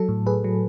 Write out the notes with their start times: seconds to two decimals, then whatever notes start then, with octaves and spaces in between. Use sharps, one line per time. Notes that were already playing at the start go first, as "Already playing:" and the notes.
Already playing: F#3 A4
0.09 A2
0.27 A2 G#4 B4
0.44 F#3